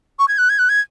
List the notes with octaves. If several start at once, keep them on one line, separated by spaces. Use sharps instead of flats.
C#6
G#6
F#6
G#6
F#6
G#6